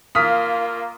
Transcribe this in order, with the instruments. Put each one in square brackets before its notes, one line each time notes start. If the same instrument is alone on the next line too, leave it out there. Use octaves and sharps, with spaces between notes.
[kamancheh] A#3 F4 [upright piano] D#6 F6 B6